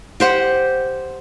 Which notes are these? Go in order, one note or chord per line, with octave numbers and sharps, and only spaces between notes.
G4 C5 F#5